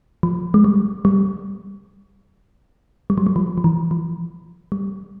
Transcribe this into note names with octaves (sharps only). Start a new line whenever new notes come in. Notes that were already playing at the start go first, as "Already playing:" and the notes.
F3
G#3
G3
G3
G3
F#3
G3
F3
F3
E3
F3
G3